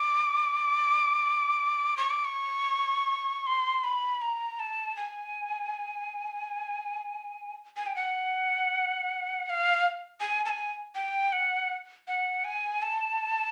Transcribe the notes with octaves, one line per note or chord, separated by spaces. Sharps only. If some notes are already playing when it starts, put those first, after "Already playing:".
Already playing: D6
C#6
D6
C#6
C6
B5
A#5
A5
G#5
G#5
G5
F#5
F#5
F5
G#5
A5
G#5
G5
F#5
F#5
G#5
A5